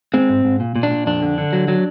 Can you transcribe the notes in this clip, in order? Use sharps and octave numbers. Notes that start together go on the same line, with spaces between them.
G#3 C4
G#2
G#2
A#2
A#2
D4
A#2
F2 D4
D3
D3
F#3
F#3